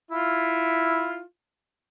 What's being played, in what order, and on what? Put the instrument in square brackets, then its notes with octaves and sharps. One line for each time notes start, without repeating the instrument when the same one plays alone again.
[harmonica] E4 F4